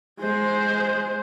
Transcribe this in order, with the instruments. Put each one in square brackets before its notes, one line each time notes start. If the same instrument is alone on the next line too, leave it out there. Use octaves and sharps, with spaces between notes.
[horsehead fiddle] G#3 C5